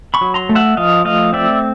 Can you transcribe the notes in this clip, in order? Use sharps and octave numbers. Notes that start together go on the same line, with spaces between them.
B5 C#6
F#3
A#5 C6
A3
E5 F#5
F3 D#5 F5
A3 D#5 F5
C4 D5 E5